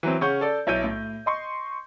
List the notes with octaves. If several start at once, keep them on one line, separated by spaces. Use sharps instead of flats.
E3 F#3 C4
C#3 C#4 F#5 C#6 G6
A4 D5
B1 E4 C#5 G6 D#7
A2
D#5 C6 C#6